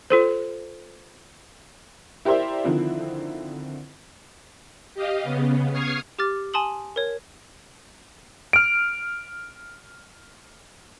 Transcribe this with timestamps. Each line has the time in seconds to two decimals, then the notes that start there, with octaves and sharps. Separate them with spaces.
0.10 F4 A4 C5
2.25 E4 G4 A#4 C5 D5 E5
2.64 D3 D#3 F3 C4 E4
4.94 G4 D#5 F5
5.23 C#3 B3
5.72 C#6 D#6 F6 G#6 C7
6.19 G4 D6 F6 A6
6.54 G#5 A5 C6 D#6 F#7
6.96 A#4 C#5
8.53 F6 D7